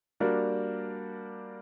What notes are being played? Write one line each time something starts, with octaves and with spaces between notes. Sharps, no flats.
G3 A#3 D4 F#4 A#4